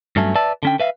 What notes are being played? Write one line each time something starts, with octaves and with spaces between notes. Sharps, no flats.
G2 F#3 A3 C#4
B4 D5 E5 A5
D3 C#4 G5
B4 E5 F5